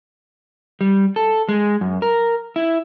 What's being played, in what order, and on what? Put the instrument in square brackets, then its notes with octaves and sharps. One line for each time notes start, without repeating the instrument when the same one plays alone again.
[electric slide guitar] G3
A4
G#3
F#2
A#4
E4